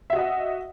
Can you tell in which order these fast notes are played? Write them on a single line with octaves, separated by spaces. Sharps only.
E5 F#4 D#5 F#5